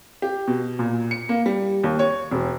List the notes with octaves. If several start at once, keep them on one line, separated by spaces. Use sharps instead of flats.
G4
B2
A#2
C#7
A#3
G3
D#2
C#5
E1